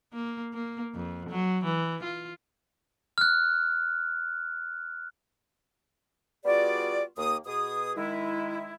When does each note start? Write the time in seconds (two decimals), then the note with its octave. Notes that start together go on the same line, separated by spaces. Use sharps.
0.14 A#3
0.54 A#3
0.95 F2
1.29 F#3
1.65 E3
2.03 F4
3.18 F6 F#6
6.45 G3 B3 F4 F#4 G#4 D5
7.17 D#2 A#3 D#6
7.46 B2 G#4 D#6
7.96 D#3 G#3 E4